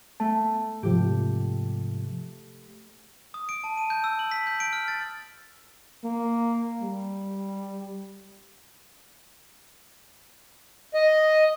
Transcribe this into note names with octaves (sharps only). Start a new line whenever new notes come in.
A3 A5
G#2 C3 F3 G4
D#6
D7
A5
D#7
G6
E6
F#7
B6
G6
D7
F6
A6
A#3
G3
D#5